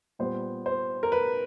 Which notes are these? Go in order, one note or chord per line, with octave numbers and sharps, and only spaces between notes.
A#2 G3 B3 C5
C5
A#4
B4